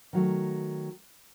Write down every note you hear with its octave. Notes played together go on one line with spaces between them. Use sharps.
D#3 F#3 A3